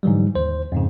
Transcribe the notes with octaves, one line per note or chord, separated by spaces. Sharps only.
G#2 D3 E3 F#3 G3
D#2 C5
F2 G#2 C#3